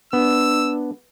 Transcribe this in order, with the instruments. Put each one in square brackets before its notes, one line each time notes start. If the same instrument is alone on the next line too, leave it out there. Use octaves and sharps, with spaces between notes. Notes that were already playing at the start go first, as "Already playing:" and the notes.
[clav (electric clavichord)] B3 [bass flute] D4 [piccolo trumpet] E6